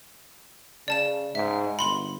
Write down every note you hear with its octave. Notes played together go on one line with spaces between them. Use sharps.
C#3 D5 A5 E7
G#2 E5
G1 B5 C6 F#7